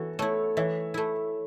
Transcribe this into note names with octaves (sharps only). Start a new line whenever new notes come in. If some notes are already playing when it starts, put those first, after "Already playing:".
Already playing: E3 F#4 A4
A3 E4 A4 C#5
E3 C#5 E5
A3 E4